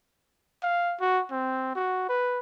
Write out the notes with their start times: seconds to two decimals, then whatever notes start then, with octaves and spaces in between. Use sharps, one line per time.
0.63 F5
1.00 F#4
1.32 C4
1.76 F#4
2.09 B4